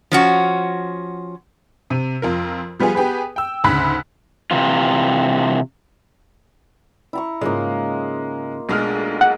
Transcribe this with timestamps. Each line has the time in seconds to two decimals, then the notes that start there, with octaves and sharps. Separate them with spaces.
0.12 F3 C#4 F#4
1.90 C3
2.22 F2 F4 A#4
2.79 F3 G3 B3 F4 G#4
2.95 B3 G4 G#4 B4
3.36 G5 E6
3.64 D2 G#2 C#3 B5 F#6 B6
4.51 C3 E3 F4
7.13 E4 A#5 C#6
7.41 G#2 C#3 G#3 A#3 F4 D#5
8.69 B1 G#3 A3 D4 G#4 F6
9.21 F#5